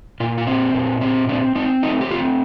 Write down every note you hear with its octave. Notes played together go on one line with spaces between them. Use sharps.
A#2 F4
F4
C4
A#2
C4
C4 D4
C4 D#4
A3 D#4
G4
C4 F4